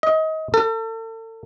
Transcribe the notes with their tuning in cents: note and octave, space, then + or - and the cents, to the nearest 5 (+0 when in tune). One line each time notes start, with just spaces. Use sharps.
D#5 +25
A4 +35